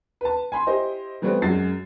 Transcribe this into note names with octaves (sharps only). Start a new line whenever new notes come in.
B4 A5
G#5 B5 C6
E4 G4 C5 D#5
E3 G3 A3 B3 C4
F#2 G#3 F#5 A6 C7